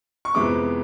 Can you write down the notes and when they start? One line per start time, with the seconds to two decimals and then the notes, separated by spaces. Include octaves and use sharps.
0.25 C#6
0.35 F2 C3 E3 G#3 B3 D6